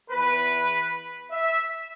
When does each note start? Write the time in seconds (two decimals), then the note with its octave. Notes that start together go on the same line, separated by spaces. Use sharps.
0.11 E2 E3 B4
1.31 E5